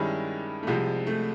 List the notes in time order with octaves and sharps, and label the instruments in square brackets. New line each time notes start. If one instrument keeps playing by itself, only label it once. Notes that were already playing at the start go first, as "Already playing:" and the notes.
Already playing: [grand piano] G2 D#3 G#3 C#4 E4 [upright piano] G3
[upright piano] A3
[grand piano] C2 C3 F3 [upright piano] G#3
[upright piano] A3